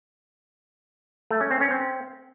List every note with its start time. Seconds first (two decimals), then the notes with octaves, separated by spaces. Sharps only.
1.31 A3
1.41 C#4
1.51 C4
1.61 C#4
1.71 C4